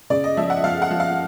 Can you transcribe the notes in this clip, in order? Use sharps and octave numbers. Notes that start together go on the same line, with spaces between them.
C#3 D5
D#5
F3 E5
F#5
F3 F5
F#5
F3
F5